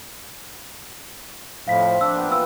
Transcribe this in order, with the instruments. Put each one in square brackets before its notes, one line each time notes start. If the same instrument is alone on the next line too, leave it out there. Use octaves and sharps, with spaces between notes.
[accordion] F2 A2 F3 [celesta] F5 B6
[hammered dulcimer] C4
[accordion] D4 [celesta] E6
[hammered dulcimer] A#2 B3 G5
[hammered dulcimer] E3 F4 B4 [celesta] E6